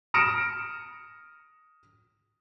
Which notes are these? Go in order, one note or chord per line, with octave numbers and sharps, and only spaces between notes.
D#6 F6 A#6 C#7 D7 E7